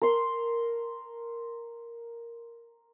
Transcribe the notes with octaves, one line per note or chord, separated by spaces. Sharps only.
A#4 C6